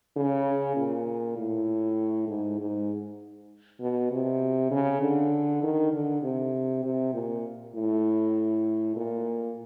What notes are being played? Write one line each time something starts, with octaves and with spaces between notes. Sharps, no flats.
C#3
A#2
A2
G#2
G#2
B2
C3
C#3
D3
D#3
D3
C3
C3
A#2
A2
A#2